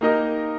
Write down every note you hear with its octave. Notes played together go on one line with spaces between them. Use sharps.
A#3 D#4 G4 A#4 D#5